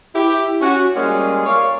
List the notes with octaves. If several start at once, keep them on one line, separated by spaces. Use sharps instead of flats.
E4 G4
C#4 F#4
G3 G#3 A#3 C#4 F4 G#4
A#4 C#5 D5 F5